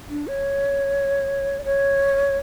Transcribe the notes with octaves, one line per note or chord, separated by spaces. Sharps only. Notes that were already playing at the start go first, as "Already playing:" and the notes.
D4
C#5
D5
C#5